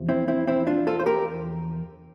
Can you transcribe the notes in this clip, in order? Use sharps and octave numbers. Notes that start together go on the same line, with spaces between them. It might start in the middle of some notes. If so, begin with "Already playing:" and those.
Already playing: E2 C3 F3
C4 E4
C4 E4
C4 E4
D4 F4
F4 A4
C5
G4 A#4